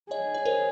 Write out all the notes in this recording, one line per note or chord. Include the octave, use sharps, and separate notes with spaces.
G#4 C#5 D#5
C#5
A#4 C5